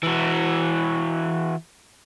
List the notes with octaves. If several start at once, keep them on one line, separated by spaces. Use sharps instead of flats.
E3 F#4